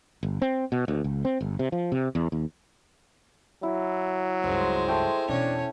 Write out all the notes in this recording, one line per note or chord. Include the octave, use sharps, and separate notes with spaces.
G1
C4
B2
D2
C#2
C4
G1
C3
F3
C3
E2
D#2
F#3 E4
C#2 G2 G#3 C5
A3 G5
E2 B2 C#4 D4 C#5